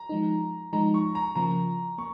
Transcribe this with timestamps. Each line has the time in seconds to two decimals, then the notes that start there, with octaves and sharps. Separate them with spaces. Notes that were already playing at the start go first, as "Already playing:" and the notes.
Already playing: A#5
0.09 F3 G#3 D#4
0.73 F3 G#3 D#4 A#5
0.94 C#6
1.15 A#5
1.36 C#3 F3 A#3 A#5
1.98 A#3 C#6